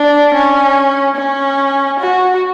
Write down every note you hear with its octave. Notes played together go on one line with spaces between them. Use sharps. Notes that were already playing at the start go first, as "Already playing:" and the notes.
Already playing: D4
C#4
C#4
F#4